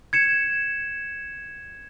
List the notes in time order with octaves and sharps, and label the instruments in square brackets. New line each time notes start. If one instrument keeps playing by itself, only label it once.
[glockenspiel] G#6 C#7 E7